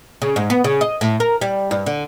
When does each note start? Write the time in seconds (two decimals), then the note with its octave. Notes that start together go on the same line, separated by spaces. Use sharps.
0.22 C#3
0.36 G#2
0.50 B3
0.64 C#3
0.81 D#5
1.01 A2
1.20 A#4
1.41 G3
1.71 G2
1.86 D3